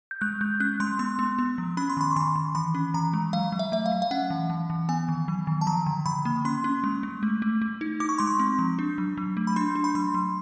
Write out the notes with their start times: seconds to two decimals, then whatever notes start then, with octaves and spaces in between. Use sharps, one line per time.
0.11 G6
0.21 G#3 F#6
0.41 G#3 G6
0.60 C#4 F#6
0.80 G#3 C6
0.99 B3 C6
1.19 B3
1.39 B3
1.58 F3
1.77 C#4 B5
1.90 C6
1.97 D#3 B5
2.11 C#6
2.16 D#3 C6
2.36 D#3
2.55 E3 B5
2.75 C#4
2.94 E3 A#5
3.13 G#3
3.33 F#3 F5
3.52 F#3
3.59 E5
3.72 A3 E5
3.86 F5
3.92 F#3
4.02 F5
4.11 C#4 F#5
4.30 E3
4.50 E3
4.70 E3
4.89 B3 G#5
5.08 D#3
5.28 F#3
5.47 D#3
5.61 A5
5.67 F3 A#5
5.86 D3
6.06 D3 B5
6.25 A#3
6.45 C#4 C6
6.64 C#4
6.84 G#3
7.03 G#3
7.23 A3
7.42 A3
7.62 A3
7.81 D#4
8.00 D#4 D6
8.09 C#6
8.18 G#3 C6
8.27 C#6
8.39 C4
8.59 F3
8.79 D4
8.98 F#3
9.17 F#3
9.37 A3
9.47 B5
9.56 D4 C6
9.75 D4
9.84 B5
9.95 F#3 C6
10.14 F#3